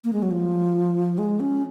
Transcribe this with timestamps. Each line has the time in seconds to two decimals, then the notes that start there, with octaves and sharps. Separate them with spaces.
0.04 A#3
0.13 G#3
0.22 F#3
0.31 F3
1.18 G#3
1.40 C#4